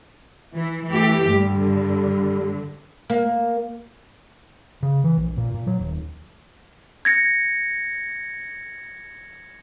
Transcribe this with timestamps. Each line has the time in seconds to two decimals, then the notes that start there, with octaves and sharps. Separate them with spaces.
0.54 E3
0.87 E3 A3 G4
1.31 G2 D3 G3
3.10 A#3
4.83 C#3
5.04 E3
5.18 A#1
5.37 A#2
5.54 A#2
5.67 F#3
5.79 D#1
7.05 G#6 A#6 C#7